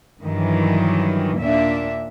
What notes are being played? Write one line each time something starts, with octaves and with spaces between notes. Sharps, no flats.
G2 D#3 E3 F#3
D#2 A#2 A#3 D4 E5